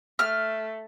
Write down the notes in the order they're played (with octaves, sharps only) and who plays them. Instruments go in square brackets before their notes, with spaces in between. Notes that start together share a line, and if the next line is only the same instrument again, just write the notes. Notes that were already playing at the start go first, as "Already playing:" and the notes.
[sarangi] A3 [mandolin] F6